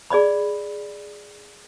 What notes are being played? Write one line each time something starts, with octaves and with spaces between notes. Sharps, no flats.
G#4 D5 D#5 B5